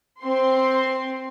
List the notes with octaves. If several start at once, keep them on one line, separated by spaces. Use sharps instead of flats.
C4 C6